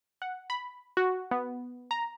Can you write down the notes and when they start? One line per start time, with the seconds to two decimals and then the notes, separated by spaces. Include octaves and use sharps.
0.22 F#5
0.50 B5
0.97 F#4
1.31 B3
1.91 A#5